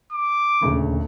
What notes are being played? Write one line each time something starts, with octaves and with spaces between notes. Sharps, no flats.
D6
D#1 D2 C#3